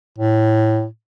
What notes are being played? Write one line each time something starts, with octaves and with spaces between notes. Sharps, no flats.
A2